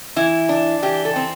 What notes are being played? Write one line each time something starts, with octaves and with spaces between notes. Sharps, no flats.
E3 E4
D4
E3 G4
A4
C4